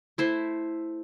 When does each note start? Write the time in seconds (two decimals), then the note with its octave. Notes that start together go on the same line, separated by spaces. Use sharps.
0.18 A3 E4 C5